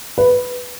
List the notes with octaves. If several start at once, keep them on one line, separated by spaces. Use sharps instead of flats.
B4